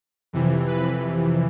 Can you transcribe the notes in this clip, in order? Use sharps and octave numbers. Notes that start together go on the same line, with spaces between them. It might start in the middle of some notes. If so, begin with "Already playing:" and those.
F2 C3 E3
B4